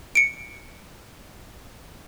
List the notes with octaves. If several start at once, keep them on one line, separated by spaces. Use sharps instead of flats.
C#7 D7